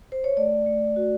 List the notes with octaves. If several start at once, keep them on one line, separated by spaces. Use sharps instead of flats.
C5
C#5
A3 D5
A3
F#4